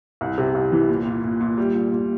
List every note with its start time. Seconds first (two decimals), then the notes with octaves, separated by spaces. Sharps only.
0.21 C2
0.38 C3
0.55 C2
0.72 E3
0.89 A#2
1.06 A#2
1.23 A#2
1.41 A#2
1.58 G3
1.74 A#2
1.92 A#2